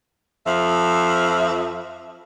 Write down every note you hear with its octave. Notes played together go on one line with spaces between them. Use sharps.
F2 F3 E5